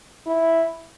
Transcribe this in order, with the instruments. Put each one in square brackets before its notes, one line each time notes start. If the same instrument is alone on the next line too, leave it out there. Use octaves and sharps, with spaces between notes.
[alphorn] E4